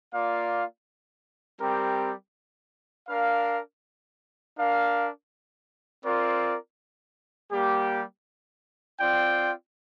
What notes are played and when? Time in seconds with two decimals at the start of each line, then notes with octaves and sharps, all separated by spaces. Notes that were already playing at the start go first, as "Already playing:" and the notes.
0.13 A#3 F4 D5 F5
1.61 G3 C4 G4 A#4
3.08 D4 A#4 F5
4.57 D4 A#4 F5
6.04 C4 F4 A#4 D5
7.52 G3 A#3 G4
8.99 C4 F4 D5 G5